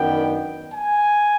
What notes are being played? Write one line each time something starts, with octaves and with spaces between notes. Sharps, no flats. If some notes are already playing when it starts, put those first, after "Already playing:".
Already playing: F#2 D#3 F#3 B3 D4 G5
G#5